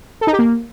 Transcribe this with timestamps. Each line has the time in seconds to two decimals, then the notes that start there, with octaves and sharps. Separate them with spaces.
0.21 A4
0.27 D#4
0.33 G4
0.39 A#3